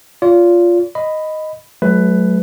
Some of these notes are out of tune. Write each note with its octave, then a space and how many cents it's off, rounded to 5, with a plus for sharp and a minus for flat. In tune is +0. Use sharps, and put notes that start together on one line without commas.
F4 +0 D5 -45
D#5 +0 B5 +10
F#3 +0 A3 -35 B4 +10